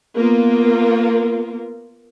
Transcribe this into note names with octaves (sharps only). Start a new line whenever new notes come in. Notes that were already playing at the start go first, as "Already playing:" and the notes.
A#3 B3 F4 A#4